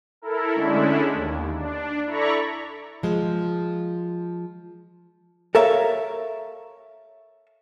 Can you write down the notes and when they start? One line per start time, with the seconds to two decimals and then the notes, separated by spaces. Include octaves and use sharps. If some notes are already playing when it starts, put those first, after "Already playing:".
0.22 E4 A4 A#4
0.55 D3 G#3 A3 C#4 D4 E4
1.13 D#2
1.55 D4
2.06 E4 A4 D5 A#5 B5 C#6
3.03 F3 G#3
5.55 A4 A#4 C#5 E5 F5